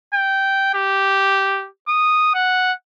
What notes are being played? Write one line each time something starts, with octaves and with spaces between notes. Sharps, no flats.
G5
G4
D#6
F#5